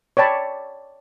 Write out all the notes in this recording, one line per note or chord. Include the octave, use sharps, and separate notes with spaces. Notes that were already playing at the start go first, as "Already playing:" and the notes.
C#5 D5 G5 A5 B5